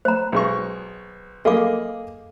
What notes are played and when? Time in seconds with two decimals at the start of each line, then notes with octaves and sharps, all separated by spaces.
0.05 C5 A#5
0.32 B1 G#3 C#6
1.45 A#3 G#4 A4 D#5 F5 D6